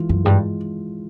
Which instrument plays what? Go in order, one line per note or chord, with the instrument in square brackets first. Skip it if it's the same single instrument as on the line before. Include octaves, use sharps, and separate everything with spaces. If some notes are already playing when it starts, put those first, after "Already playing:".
Already playing: [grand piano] E3 G#3 F4
[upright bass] F#2
[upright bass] G2 [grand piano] G#3